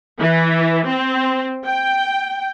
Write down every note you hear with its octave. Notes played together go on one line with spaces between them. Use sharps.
E3
C4
G5